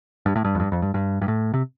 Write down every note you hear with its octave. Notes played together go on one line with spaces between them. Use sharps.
G2
A2
G2
F2
G2
F2
G2
G2
G2
A2
C3